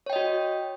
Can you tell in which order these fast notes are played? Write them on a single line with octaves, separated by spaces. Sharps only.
C#5 G5 D#5 F#4